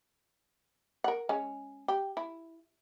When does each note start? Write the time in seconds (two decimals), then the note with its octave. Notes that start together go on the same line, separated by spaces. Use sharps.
1.04 A#4 F#5
1.29 G#3 C#4
1.88 G4
2.17 E4